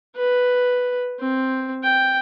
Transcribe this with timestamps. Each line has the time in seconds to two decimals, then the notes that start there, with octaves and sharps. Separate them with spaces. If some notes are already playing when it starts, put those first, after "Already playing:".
0.16 B4
1.20 C4
1.83 G5